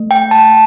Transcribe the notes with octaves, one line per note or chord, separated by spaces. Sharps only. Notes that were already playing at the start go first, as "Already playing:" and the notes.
Already playing: A3
G5
A5